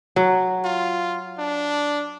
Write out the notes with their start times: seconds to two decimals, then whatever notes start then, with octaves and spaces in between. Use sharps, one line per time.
0.16 F#3
0.64 F4
1.38 D4